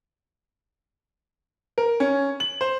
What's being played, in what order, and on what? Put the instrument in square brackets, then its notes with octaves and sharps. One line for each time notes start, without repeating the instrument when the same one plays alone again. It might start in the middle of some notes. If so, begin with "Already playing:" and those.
[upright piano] A#4
C#4
F#7
C5